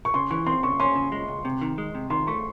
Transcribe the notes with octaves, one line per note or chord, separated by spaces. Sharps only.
C#6
C#3 C6
E3 C#6
C4 C6
C#3 C#6
C#4 C6
C#3
G#3
C#2
C3
D#3
G#3
C3
D#3 C6
A3 C#6